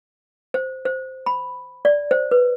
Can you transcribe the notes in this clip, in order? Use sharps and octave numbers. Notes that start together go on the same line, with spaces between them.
C5
C5
B5
D5
C5
B4